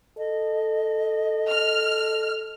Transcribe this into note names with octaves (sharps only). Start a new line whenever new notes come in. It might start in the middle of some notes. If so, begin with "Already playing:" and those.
A4 D#5
F6